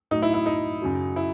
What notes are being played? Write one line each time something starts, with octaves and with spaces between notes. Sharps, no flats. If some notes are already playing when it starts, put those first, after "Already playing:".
A2 F#3 D#4
E4
E4
D#4
F#2 C#3 F#3
E4